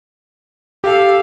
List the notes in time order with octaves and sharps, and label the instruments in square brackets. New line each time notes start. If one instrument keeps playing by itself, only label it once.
[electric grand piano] G4 [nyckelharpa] A4 F5